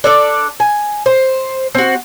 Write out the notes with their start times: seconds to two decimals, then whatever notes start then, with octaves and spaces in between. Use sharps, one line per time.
0.04 D4 A4 D5
0.60 G#5
1.06 C5
1.75 C4 F#4